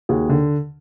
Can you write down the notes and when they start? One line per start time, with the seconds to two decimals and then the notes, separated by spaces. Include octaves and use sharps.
0.09 D#2 F#4 G#4
0.29 D3